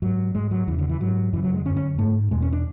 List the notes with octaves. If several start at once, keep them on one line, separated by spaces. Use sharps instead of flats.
G#2 F#3
G#2 G#3
F#3
E2 C#3 E3
D3
E3
G#2 F#3
F#2 C#3 E3
F#3
G#3
F#2 D3 C#4
C#4
G#2 A3
E2 B2 G#3
C#4
D4